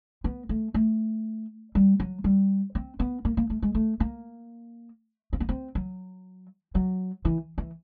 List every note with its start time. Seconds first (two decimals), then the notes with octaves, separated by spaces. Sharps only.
0.24 B3
0.49 A3
0.74 A3
1.75 G3
2.00 F#3
2.24 G3
2.75 C4
3.00 B3
3.25 A#3
3.37 A#3
3.50 A3
3.62 G#3
3.75 A3
4.00 A#3
5.33 C4
5.40 B3
5.49 C4
5.75 F#3
6.75 F#3
7.25 E3
7.58 E3